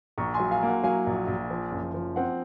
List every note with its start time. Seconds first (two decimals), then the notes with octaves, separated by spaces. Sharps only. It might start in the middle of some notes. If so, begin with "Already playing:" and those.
0.18 A#1 A#5 C#6
0.34 G#5 C6
0.39 F#3
0.51 F5 G#5
0.62 A#3 F#5
0.83 F#3 F5 G#5
1.07 A#1
1.28 A#1
1.50 F3
1.72 F#1
1.94 F3
2.16 C4 F#5